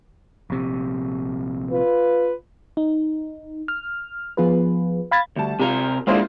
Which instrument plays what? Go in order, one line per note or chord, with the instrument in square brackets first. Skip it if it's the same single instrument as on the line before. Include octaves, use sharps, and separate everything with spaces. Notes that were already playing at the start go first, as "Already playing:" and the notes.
[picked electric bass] A#1 C3
[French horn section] F4 B4
[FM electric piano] D#4
F6
F3 B3 F4 G#4 B4
F5 B5 G#6 A6
[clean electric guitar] D2 [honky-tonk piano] G3 A5
[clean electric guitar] C3 A#4 [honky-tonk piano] F4 G4
[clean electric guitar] G#3 A#3 D4 [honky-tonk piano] E4 F4 C5